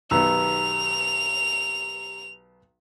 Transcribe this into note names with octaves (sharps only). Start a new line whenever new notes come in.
B1 D#3 B3 G4 A#5 E6 F7